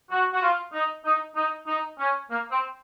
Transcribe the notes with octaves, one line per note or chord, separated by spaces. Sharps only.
F#4
F#4
F4
D#4
D#4
D#4
D#4
C#4
A#3
C4